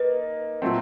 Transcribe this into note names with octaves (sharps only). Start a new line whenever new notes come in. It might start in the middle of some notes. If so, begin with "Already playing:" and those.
Already playing: A#3 D#4 B4
A#2 F#3 A3 C4